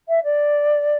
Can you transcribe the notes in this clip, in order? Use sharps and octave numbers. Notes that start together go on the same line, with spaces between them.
E5
D5